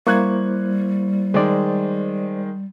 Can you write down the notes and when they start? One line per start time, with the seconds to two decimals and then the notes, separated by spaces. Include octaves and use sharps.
0.07 G3 A#3 E4 C5 C#6 F#6 G#6
1.34 D#3 G#3 C5 D5